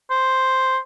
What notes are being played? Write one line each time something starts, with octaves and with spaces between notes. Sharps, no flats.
C5